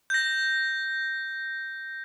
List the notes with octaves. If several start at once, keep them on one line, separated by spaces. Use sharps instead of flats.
G6 A#6